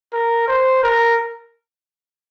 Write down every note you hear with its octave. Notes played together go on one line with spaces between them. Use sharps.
A#4
C5
A#4